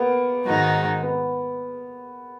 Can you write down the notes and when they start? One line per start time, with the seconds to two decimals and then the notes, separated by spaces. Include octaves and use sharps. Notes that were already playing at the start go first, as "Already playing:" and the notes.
Already playing: A#3 B3
0.46 G#2 D#3 G#3 D#4 F#4
1.03 B3